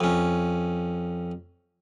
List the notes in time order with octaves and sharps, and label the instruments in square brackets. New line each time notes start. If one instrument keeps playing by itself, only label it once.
[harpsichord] F2 C#4